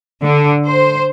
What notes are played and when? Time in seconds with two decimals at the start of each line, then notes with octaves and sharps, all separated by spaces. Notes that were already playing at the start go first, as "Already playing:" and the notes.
0.25 D3
0.66 C5